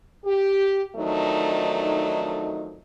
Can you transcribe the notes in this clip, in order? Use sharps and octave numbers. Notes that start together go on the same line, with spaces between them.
G4
F2 D#3 F#3 A3 D4 D#4